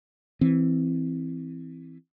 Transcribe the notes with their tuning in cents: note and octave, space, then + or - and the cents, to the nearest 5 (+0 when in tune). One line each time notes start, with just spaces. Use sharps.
E3 +0 C4 +0